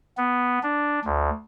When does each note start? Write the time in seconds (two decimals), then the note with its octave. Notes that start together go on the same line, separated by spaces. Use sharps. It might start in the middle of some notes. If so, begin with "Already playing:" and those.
0.18 B3
0.63 D4
1.05 D2